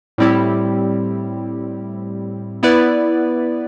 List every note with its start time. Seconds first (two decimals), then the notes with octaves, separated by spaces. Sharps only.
0.18 A2 G3 C4 E4 G4
2.63 B3 E4 B4 D5